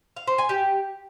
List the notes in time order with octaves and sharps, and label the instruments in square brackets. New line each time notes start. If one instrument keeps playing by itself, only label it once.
[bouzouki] F5
C5
G#5
G4